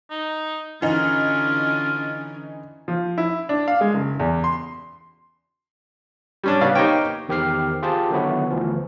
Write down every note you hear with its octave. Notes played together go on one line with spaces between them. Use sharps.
D#4
D3 E3 C#4 D#4 F4
F3
E4
D4
F5
G#3
F#1
E2
C6
G3 C#4 D4
C#3 B3 D5 F5
A#3 D#4 G4 C5 C#5 G5
E2 D#3 G4 C5 F6 C7
F4 G4 G#4 C5 A5
D3 D#3 F#3 B3 E4 F#4
D2 E3 F3